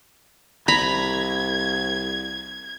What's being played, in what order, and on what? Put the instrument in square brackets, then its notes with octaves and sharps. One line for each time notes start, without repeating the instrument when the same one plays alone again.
[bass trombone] C2 [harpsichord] A#5 [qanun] B5 [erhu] G#6